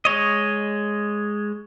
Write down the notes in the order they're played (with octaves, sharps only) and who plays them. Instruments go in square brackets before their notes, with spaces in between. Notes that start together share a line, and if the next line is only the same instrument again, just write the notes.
[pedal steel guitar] G#3 C#5 D#5